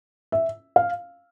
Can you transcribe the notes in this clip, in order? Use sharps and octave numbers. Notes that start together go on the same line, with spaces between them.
E5
F5